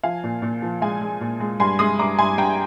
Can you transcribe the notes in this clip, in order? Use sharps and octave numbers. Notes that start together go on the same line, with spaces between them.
F3 F5 G#5
A#2
A#2
F3
G#3 F5 G#5
G#3
A#2
G#3
G2 G#5 C6
G#3 C6 D#6
G2 A#5 D6
G2 G#5 C6
G2 G5 A#5